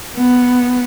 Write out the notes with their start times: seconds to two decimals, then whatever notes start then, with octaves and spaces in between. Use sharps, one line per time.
0.15 B3